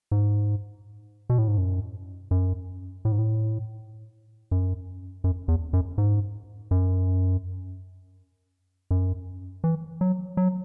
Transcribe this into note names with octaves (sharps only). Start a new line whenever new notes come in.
G#2
B2
A2
G#2
F#2
F#2
A2
G#2
A2
F#2
F#2
E2
F#2
G#2
F#2
F#2
E3
F#3
F#3